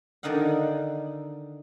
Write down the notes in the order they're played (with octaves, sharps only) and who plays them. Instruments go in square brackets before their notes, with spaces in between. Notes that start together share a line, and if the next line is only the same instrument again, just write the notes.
[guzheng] D3 D#3 D#4 F5 F#5